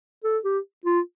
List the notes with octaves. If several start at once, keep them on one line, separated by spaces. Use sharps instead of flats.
A4
G4
F4